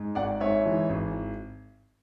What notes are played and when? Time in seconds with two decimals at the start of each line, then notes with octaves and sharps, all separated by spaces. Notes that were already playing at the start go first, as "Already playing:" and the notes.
Already playing: G#2
0.15 G#1 D5 F#5
0.40 G#2 C#5 E5
0.66 E3
0.89 G#1